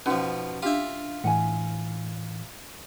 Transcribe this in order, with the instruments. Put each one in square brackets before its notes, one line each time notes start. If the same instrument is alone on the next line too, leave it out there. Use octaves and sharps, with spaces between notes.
[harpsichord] B2 F3 [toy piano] C#4 D#4 F#4
[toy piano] D4 F5 [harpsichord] F4 E5 [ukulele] G4
[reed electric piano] A2 E3 [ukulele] F#5 G#5